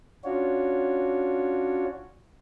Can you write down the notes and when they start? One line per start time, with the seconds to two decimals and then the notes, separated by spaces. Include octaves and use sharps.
0.24 C#4 D4 F4 F#4 C#5